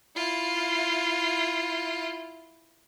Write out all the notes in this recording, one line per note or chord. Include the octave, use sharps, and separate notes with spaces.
E4 F4